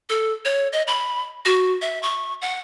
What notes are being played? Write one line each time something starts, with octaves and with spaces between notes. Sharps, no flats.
A4
C#5
D#5
B5
F#4
E5
C#6
F#5